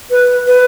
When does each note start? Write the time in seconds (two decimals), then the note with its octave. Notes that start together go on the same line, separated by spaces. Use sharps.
0.11 B4
0.47 B4